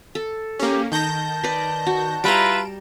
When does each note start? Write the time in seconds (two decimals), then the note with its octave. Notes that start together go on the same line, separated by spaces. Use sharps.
0.15 A4
0.59 A#3 C#4 G4
0.92 D#3 A5 G6 A#6
1.43 B4 D5
1.87 F#4
2.24 G3 E4 F4 B4 G5 A#5 D7 E7